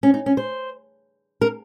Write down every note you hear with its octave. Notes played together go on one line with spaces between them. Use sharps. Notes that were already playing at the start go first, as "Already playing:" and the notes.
C#4
D#4
C#4
C5
A#4